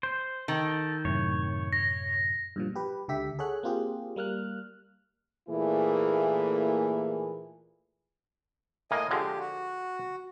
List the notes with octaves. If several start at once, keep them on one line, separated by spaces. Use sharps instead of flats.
C5
D#3 A4
F#2 A2 C3 C#5
A#6
G2 A#2 F3
G4 B4
C#2 D3 G4 E5 B6
G#4 A4 C#5 F#5 F#6
A#3 C4 F4 G4 G#4
G3 A#3 F6 F#6
A#2 E3 A3 A#3 E4 G#4
A2 A#3 D#5 G#5
D3 F3 G#3 G4
F#4